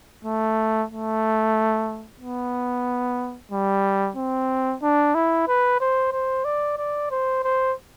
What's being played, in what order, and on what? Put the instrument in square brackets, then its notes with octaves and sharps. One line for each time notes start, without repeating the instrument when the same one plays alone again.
[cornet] A3
A3
B3
G3
C4
D4
E4
B4
C5
C5
D5
D5
C5
C5